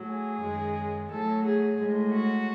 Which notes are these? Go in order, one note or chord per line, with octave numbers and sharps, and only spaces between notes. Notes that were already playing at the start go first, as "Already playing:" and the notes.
Already playing: A2 F#3
G#4
F#2 D#3 G#3
A2 F#3 A4
G#4
A2 G#3
F#4